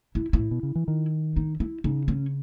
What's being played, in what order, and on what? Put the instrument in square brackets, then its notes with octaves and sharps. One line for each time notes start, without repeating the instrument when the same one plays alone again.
[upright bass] E4
E4
[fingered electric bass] A2
B2
C#3
E3
D#3
[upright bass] D#4
E4
[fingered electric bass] C#3 [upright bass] D#4
[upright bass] C#4